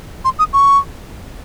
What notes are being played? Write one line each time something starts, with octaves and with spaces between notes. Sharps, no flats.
C6
D#6
C#6